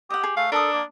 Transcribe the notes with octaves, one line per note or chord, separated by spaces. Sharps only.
G4 D#5 F#5
G#4
A3 F5
D4 A4 A#4 A5 D#6
A#3